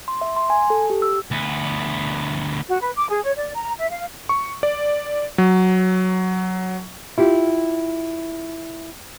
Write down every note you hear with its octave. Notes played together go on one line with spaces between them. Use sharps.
C6
E5
C6
G#5
A4
G4
E6
D2 B3
F#4
B4
D6
G#4
C#5
D5
A#5
E5
F5
C#6
D5
F#3
E4 F4 G4